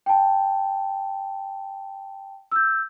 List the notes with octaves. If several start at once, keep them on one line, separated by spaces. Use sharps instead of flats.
G5 A5
E6 G6